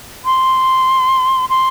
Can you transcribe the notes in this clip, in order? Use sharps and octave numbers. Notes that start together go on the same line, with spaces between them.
C6
C6